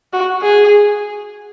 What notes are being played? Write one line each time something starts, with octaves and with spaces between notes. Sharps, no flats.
F#4
G#4